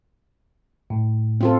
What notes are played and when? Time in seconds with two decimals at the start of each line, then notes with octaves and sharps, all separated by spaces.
0.90 A2
1.41 C4 F4 A4